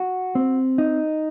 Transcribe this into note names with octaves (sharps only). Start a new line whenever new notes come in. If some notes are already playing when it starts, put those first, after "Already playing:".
Already playing: F#4
C4
D#4